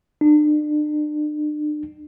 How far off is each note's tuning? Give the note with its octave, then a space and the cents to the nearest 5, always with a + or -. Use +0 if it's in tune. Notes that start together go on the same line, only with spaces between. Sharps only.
D4 +40